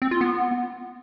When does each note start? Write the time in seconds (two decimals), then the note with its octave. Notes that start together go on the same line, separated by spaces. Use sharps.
0.02 C4
0.11 F4
0.21 B3